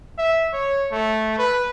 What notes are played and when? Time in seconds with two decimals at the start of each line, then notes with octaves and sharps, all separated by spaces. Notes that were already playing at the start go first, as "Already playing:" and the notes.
0.18 E5
0.53 C#5
0.92 A3
1.39 B4